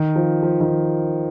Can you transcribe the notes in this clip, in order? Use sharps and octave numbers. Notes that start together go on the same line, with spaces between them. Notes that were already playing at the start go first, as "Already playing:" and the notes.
Already playing: D#3
F3
F3
D#3